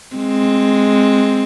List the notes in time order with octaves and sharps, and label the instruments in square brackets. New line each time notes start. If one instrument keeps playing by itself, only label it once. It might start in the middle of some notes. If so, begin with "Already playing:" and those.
[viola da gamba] G#3 C4